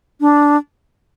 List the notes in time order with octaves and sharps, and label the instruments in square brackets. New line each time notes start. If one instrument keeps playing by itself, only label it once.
[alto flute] D4